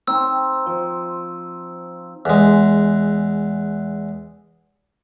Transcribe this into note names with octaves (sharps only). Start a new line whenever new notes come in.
C4 D#4 E6
F3
E2 G#3